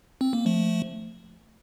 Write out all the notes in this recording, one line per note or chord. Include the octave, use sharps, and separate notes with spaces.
C4
A#3
F3 A3